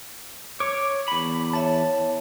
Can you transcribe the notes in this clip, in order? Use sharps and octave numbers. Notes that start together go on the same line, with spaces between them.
C#5 D6
E2 B5
C#5 E5 A5